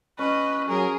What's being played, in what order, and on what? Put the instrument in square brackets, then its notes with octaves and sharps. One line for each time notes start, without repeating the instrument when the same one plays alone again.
[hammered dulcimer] C#4 [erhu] B4 [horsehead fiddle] D#5
[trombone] F#3 [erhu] G#4 [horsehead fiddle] A#4